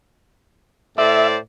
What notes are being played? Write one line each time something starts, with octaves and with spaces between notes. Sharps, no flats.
A2 C5 D5 E5